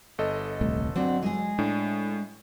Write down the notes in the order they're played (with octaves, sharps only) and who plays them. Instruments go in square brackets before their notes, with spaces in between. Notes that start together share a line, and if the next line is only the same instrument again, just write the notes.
[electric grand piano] G1 A4 D#5
[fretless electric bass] D#1 C2 A3
[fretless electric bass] F#3 [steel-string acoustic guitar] C4 D4 F#4
[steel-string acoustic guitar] G#3 G#4
[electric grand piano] A2 [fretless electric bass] D4